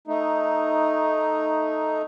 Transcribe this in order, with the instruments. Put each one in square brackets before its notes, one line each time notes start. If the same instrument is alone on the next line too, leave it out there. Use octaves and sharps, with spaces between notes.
[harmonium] A3 D#4